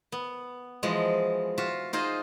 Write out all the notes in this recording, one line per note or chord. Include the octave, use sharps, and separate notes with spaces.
B3
E3 F3 G#3 F#4
F4 F#4 E5
D#4 F4 G#4 C5 D#5